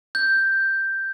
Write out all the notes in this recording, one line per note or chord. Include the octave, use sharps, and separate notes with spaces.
G6